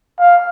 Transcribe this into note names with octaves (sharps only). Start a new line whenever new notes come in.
F5